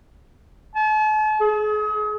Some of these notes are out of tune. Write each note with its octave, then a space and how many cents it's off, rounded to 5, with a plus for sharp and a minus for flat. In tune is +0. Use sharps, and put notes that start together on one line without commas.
A5 -45
G#4 +35